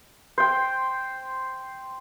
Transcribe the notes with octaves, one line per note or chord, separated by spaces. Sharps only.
C5 G5